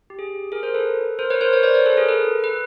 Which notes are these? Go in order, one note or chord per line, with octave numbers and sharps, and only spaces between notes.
G4
G#4
G#4 A#4
A#4 C5
A4 B4
A#4 C5
B4 C#5
A#4 C5
B4 C#5
C5 D5
B4 C#5
A4 B4
G#4 A#4
A4 B4
B4